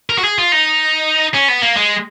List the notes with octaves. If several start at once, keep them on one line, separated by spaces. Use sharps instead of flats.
A#4
F#4
G#4
F4
D#4
C#4
B3
A#3
G#3